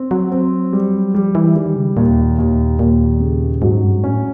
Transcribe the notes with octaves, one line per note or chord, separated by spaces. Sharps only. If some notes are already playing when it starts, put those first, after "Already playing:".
Already playing: C4
F#3
C4
G3
F3 G3
E3
D#3 G3
C#3
D#2 A#2
D#2
D#2 A#2
C#3
G#2 F#3
G2
G#2
A2 C#4